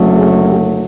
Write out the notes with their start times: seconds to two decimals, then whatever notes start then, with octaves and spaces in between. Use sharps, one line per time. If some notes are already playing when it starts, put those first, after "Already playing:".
Already playing: F#1 F#2 D3 F#3 A3
0.15 G#4
0.45 G4